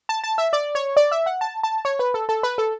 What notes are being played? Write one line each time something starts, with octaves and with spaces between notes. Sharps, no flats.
A5
A5
E5
D5
C#5
D5
E5
F#5
A5
A5
C#5
B4
A4
A4
B4
A4